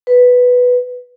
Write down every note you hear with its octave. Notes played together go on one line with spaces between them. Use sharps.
B4